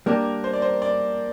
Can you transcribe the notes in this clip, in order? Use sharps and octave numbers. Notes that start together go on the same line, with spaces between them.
G3 A#3 D4 G4 A#4
C5
D5
C5
D5